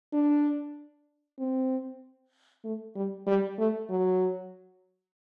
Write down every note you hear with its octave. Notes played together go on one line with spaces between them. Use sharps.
D4
C4
A3
G3
G3
A3
F#3